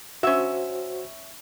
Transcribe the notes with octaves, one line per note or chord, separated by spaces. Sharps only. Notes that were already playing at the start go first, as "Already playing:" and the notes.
C#4 F#4 C5 E5